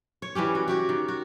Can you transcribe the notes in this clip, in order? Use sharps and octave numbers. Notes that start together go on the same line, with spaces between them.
C#5
E3 G3 C#4 G4
F#4
F#4 G4 C#5
D#3
F#4